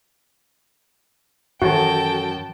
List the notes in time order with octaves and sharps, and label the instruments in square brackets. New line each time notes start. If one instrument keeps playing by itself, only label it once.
[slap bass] F#2 [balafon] D#3 E3 E5 [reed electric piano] F#4 A4 [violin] G5 A5